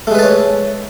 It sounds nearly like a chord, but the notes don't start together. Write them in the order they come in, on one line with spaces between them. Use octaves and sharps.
A3 G#3 B4 A4 C#5